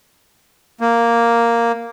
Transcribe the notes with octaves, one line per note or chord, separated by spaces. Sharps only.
A#3